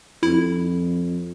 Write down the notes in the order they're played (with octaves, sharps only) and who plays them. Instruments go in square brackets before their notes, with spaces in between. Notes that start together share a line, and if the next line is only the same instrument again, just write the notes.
[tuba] F2 [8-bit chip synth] E4